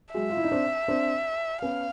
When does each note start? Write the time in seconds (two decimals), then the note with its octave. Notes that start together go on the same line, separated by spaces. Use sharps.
0.14 F#3 G#3 E5
0.30 F4
0.37 E4
0.45 D#4
0.51 C4 D4
0.88 C4 D4
1.62 B3 C#4 F5